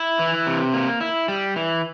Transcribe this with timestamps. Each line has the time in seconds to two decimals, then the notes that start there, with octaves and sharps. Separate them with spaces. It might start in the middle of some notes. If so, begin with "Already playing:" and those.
Already playing: E4
0.19 E3
0.47 C3
0.73 A#3
1.01 E4
1.28 G3
1.56 E3